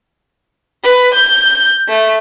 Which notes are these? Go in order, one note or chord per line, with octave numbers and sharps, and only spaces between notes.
B4
G6
A3